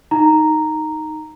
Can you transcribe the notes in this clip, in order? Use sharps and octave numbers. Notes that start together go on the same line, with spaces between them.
D#4 A#5